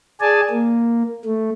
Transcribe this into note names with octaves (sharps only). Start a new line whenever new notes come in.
G#4 D5 G#5 A5
A#3
A3